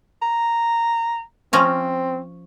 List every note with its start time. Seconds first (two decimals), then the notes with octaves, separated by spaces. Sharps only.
0.22 A#5
1.53 F3 C4 C#4 A#5